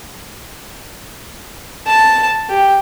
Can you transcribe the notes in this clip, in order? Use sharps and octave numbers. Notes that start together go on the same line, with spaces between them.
A5
G4